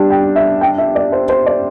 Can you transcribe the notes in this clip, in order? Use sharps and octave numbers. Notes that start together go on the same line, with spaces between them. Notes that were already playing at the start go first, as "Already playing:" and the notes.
Already playing: G3 D4 G4 A5
G5
E5
G5
E5
D5
C5
C5
D5